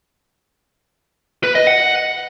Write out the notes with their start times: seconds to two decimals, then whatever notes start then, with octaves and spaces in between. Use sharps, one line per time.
1.43 B4
1.55 D#5
1.67 F#5